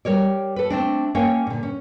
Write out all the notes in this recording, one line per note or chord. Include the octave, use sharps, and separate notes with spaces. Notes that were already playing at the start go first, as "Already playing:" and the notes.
G3 A#4 C#5 D5
A4 B4
A3 C4 D4
A#3 C#4 A#4 C#5 F5 G5
A#2 D3
C#4